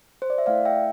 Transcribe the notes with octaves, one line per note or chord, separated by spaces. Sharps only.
C5
D5
E5
A3 E4 A4 D5 F5
E5 G5